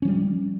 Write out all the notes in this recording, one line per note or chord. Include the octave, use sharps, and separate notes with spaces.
F3 G3 C#4